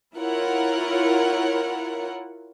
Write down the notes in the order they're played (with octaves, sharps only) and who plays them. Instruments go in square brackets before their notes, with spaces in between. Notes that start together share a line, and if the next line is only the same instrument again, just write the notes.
[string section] E4 F4 A#4 C#5 F#5